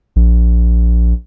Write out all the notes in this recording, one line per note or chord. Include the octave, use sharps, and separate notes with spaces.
A#1